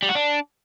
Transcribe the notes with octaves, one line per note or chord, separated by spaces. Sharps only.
G3
F#4
D4